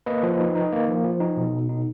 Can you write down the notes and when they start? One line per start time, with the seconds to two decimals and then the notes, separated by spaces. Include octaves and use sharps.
0.06 A#3 B4 D#5
0.23 F3
0.40 D#4
0.55 D#4
0.72 A#3
0.88 F3
1.04 F3
1.20 D#4
1.37 B2
1.52 B2
1.69 D#4